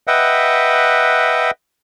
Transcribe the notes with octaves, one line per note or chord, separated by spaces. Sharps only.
B4 D#5 E5 F#5 G5